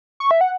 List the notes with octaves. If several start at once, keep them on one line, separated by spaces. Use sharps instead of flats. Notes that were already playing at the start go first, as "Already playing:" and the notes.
C#6
E5
F#5